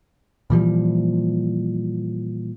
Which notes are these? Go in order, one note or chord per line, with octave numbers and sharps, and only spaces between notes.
A#2 E3 F3 G3